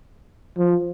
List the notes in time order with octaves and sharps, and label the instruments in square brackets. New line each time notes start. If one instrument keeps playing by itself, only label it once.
[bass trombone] F3